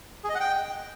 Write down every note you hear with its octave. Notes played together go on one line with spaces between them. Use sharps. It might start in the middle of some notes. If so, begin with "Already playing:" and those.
G#4
D#5
F#5
G5